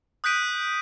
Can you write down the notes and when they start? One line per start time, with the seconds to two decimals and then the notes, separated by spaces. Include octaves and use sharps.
0.24 D#6 F#6 G6 B6 D7 D#7